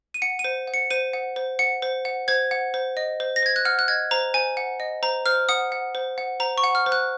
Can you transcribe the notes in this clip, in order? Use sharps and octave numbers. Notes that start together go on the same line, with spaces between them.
D#7
F#5 C#7
D#7
C5
F#5
C#7
C5 D#7
F#5
C5
F#5 C#7
C5
F#5
C5 G#6
F#5
C5
D#5
C5
A#6
C5 G#6
F#6
F#5 F6
F#6
D#5 G#6
C5 A#5
C5 G#5
F#5
D#5
C5 A#5
C5 F6
F#5 D#6
F#5
C5
F#5
C5 A#5
C#6
F#5
F6
C5
F#6